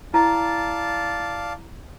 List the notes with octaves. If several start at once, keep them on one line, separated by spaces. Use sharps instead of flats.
E4 D5 F5 A5 A#5